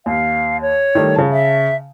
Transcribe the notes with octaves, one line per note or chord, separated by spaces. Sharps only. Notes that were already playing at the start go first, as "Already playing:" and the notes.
D#2 F5
C#5
D#3 G3 A3
C#3 A5
E5